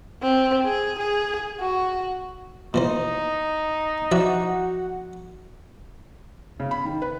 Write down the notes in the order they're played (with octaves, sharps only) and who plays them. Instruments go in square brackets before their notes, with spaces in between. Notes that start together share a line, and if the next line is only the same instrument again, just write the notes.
[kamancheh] C4
G#4
G#4
F#4
[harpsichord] A#2 E3 C5 [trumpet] D#4
[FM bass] F3 [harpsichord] E4 D5 E5 [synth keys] F#4 F#5
[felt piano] C#3
B5
D#3
B4